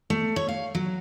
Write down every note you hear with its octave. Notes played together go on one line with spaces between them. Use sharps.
A3
C#5
F5
F#3